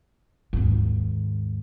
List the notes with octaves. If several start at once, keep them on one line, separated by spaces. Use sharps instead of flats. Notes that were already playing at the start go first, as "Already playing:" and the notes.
D#2 G#2